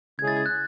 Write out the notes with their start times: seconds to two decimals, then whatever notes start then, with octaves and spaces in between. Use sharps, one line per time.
0.19 C#3 G#3 C#4 E4 G#4 G#6
0.28 A6
0.37 G#6
0.46 F#6